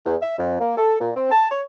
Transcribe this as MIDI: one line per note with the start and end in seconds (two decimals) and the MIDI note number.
0.06 0.16 40
0.21 0.36 76
0.38 0.57 41
0.60 0.76 58
0.77 0.96 69
1.00 1.10 46
1.16 1.27 60
1.31 1.48 81
1.50 1.61 73